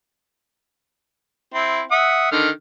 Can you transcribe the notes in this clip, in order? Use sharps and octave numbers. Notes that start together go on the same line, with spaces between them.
C4 E4
E5 F#5 D#6
D3 D#3 F6